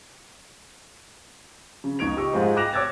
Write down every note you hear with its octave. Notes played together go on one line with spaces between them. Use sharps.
C#3
C#2 D#4 C#6 G#6 D7 F7
G4 D#5 C#6 E6
G#2 G#3 F4 C5
G5 D6 F#6 A#6 E7 F7
C#5 D6 E6 F#6 G#6 A6